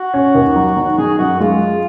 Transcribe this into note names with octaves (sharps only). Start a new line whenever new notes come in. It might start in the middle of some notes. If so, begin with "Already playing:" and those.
Already playing: F#4
C#4
D#2
F#3
D#3
D#3 G#4
F#2 F#4
G#3 F4